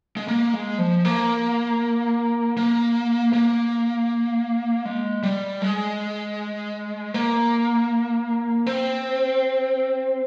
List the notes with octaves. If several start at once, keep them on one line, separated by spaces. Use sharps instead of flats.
G#3
A#3
G#3
F3
A#3
A#3
A#3
G#3
G3
G#3
A#3
C4